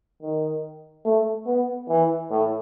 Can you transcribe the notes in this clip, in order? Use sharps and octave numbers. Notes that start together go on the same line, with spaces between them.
D#3
A3
B3
E3
A2